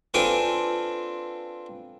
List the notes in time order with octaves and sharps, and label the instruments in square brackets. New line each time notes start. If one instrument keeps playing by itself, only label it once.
[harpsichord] C4 D4 F4 A4 B4 G#5